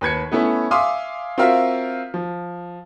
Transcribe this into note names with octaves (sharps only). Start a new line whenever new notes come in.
D#2 B4 G#6 C#7
A3 B3 C#4 E4
E5 F5 G#5 C6 D6 D#6
C4 F4 F#4 A#4 E5 F5
F3